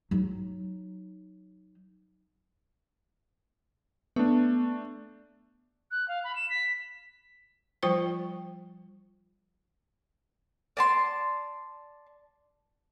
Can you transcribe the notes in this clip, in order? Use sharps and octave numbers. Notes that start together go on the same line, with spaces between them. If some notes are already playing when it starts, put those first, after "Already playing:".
F#3 D#4
A3 B3 D4
F#6
F5
B5
E7
B6
F3 G3 F4 C5 G5 C#6
D5 A5 C6